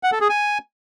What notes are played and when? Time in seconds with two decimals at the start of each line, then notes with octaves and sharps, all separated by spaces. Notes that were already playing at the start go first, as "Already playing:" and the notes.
0.03 F#5
0.12 A4
0.21 G#4
0.29 G#5